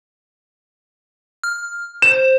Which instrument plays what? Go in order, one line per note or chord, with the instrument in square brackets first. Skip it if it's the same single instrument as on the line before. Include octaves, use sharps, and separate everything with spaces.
[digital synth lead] F6
[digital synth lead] C5 [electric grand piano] E7